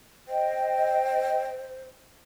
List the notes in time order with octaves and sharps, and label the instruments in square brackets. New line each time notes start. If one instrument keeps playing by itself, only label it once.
[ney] C5 [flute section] D#5 G5